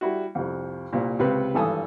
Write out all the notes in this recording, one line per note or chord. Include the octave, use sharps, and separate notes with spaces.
G3 E4 F#4
C2 F2
C2 A#2
C#2 C3 B4
G#1 G2 E3 A4 G#5 D#6